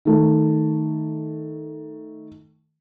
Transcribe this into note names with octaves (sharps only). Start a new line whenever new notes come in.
D#3 A3